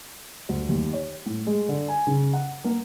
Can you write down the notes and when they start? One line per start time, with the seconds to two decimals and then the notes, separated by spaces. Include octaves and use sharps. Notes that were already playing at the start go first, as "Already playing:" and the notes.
0.49 D2
0.69 D#2
0.93 C#5
1.26 A2
1.47 G#3
1.68 D3
1.88 G#5
2.07 C#3
2.33 F#5
2.64 A#3